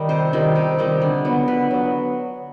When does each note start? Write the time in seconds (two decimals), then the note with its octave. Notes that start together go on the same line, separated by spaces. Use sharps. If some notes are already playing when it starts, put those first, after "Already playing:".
Already playing: D#3 G3
0.09 C3 C5
0.33 D#3 G3
0.56 C3
0.79 D#3 G3
1.02 D3
1.25 F#3 B3
1.48 D3 B4
1.71 F#3 B3